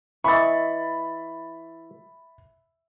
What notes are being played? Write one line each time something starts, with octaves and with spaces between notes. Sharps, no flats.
E3 E4 D#5 E5 B5 C#6 A6